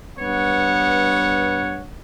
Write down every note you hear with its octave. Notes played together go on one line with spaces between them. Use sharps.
G2 B3 C#5 F#5